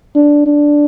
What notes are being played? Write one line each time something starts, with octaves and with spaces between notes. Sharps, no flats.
D4
D4